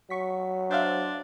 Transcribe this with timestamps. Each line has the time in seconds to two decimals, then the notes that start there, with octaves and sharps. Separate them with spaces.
0.10 F#3 C#6 B6
0.71 D4 C5 E5 F5